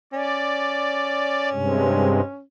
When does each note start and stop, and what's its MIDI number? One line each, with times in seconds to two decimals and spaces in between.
0.13 2.41 61
0.13 1.49 74
1.52 2.21 43
1.52 2.21 48
1.52 2.21 56